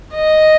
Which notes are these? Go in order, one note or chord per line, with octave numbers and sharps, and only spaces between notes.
D#5